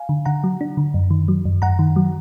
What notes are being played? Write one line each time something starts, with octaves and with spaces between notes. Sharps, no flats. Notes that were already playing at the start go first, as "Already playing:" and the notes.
Already playing: F5 G#5
D3
D3 F#5 A#5
F#3
D4
D3
F#2
D#3
F#3
F#2
F#2 F#5 A#5
D#3
F#3